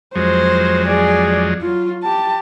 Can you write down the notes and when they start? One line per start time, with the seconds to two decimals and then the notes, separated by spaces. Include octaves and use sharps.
0.15 F2 F#3 G#3 C5
0.87 G#4 D5
1.62 F#3 F4
2.03 G4 A5